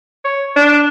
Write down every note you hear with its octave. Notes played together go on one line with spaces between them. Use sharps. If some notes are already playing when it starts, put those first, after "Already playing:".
C#5
D4